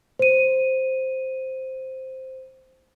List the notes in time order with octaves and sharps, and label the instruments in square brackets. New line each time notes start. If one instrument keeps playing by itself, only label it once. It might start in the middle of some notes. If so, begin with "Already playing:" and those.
[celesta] C5 D#7